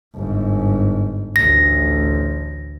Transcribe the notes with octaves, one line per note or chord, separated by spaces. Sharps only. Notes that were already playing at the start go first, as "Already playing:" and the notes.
G1 G#2
A1 D2 A#6